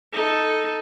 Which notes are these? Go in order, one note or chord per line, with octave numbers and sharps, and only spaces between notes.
D#4 A4